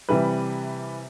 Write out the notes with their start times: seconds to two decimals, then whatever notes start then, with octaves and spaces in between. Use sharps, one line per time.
0.09 C3 E3 G3 B4